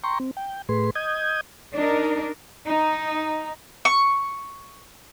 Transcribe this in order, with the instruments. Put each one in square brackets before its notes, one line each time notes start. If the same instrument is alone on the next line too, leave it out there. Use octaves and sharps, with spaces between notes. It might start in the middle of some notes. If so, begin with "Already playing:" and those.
[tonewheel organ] G5 A#5 C6 C#6
C4
G5
A2 A3 G#4 B4 C6
D#5 D#6 G6 G#6
[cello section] D4 D#4 A#4
D#4
[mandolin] C#6